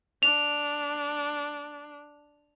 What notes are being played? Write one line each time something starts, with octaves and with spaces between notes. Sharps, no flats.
D4 F7